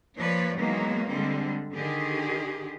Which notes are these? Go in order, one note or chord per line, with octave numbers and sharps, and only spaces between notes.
F3 A#3 B4 C#5 D5
D#3 E3 F#3 G#3 A#3 B3
D3 G3 G#3 C4
D3 D#3 G4 G#4